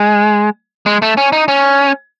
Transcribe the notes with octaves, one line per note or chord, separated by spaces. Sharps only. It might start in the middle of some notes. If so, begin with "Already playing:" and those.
Already playing: G#3
G#3
A3
C#4
D#4
C#4